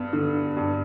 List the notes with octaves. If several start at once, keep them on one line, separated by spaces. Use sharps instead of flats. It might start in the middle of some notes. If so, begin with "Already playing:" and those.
Already playing: G2 B3
D3
G2